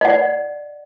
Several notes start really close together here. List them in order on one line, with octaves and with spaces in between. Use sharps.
D#5 F#5 D5